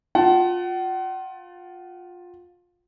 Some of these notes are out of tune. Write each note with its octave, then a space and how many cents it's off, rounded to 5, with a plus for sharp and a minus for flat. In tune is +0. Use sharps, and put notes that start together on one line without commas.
F4 +20 F#5 +40 A5 +0